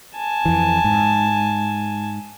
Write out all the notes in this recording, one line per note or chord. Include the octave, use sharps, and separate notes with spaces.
G#5 A5
F2 E3
G#2